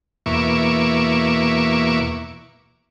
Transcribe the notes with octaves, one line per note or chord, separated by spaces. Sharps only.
E2 B2 A#3 E5 C#6 D6